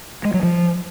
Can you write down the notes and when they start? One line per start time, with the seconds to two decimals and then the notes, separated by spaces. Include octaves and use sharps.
0.25 G#3
0.34 F#3
0.43 F3